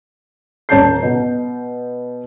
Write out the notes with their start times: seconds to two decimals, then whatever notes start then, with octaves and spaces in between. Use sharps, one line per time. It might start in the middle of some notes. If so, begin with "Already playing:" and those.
0.69 D#1 C#5 A5 A#5 G6 C7
1.03 B2